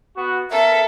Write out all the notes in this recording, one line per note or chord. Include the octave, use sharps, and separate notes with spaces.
B3 F#4
B3 A4 A#4 E5